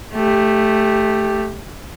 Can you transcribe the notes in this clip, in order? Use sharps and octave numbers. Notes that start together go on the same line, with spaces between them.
A3 G4